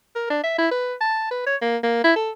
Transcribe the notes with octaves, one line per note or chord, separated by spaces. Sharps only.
A#4
D4
E5
E4
B4
A5
B4
C#5
A#3
A#3
E4
A4